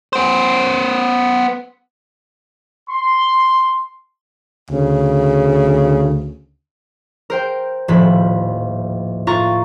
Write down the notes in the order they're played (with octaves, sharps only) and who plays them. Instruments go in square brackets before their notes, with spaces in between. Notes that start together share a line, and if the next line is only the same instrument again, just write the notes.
[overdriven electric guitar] B3 C5
[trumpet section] C6
[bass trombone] D2 [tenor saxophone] C#3
[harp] A#4 C5 G5
D#1 A2 F3 B5
A2 F4 A#5 C#6 A6